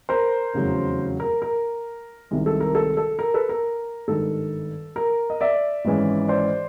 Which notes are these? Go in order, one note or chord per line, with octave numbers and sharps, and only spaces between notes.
A#4 C5
F1 E2 C#3 F#3
A#4
A#4
C2 C3 D#3 G#3
A4
A#4
A4
A4
A#4
A4 B4
A#4
G#1 G2 D#3 A4
A#4
D#5
D5 E5
G#1 G#2 E3 G#3 C#4
C5 D5